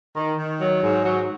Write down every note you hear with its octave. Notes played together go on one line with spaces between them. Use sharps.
D#3
D#3
F#3
G#2
F#3